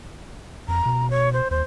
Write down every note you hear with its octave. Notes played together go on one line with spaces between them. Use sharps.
F2 A#5
B2
C#5
C5
D#2 C5